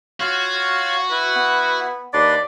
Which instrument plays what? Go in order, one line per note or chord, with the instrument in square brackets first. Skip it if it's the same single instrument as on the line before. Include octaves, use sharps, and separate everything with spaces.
[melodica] F4 C#5 F5 [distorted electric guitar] F#4
[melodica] E4 [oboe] B4
[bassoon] B3
[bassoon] D#2 [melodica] D4 B4 C6 [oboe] D5